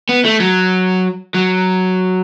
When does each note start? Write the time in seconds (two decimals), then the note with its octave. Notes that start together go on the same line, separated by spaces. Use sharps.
0.09 B3
0.25 A3
0.40 F#3
1.34 F#3